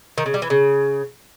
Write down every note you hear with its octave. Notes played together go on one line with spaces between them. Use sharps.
D#3
C#3
G3
E3
C#3